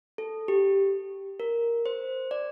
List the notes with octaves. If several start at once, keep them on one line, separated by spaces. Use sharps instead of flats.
A4
G4
A#4
C5
D5